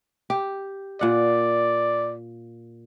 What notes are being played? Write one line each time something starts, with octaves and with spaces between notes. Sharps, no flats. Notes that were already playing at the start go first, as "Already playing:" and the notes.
G4
A#2 D5 F#5